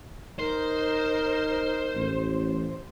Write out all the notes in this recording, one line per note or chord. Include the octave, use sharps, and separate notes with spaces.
D#4 A#4 C5
A1